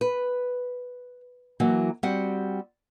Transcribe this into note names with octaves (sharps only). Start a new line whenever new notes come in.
B4
E3 F#3 A#3
G3 C4 F#4 F#5